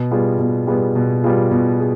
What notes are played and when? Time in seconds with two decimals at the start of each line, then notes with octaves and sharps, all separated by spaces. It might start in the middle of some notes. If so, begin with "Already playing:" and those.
Already playing: B2
0.11 G3 B3 F4 G#4
0.39 B2
0.67 G3 B3 F4 G#4
0.96 B2
1.24 G3 B3 F4 G#4
1.51 B2
1.80 G#4